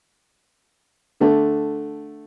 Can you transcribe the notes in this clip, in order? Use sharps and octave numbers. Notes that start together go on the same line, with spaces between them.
D3 A3